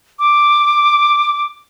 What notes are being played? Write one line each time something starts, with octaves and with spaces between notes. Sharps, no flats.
D6